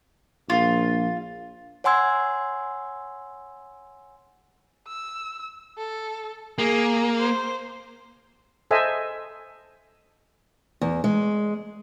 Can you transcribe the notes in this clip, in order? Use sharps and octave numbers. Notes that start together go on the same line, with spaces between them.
A#1 F4
C#5 F#5 G#5 C6 E6 G#6
E6
A4
A#3 G#4
C5
A4 C5 D#5 E5 G#5
E2
G#3